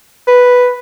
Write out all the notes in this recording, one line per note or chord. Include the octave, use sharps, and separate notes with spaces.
B4